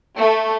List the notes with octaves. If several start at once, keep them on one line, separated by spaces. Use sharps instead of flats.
A3